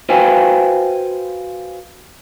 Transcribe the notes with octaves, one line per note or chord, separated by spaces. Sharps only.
F#4 B4 C5 F5 G5 G#5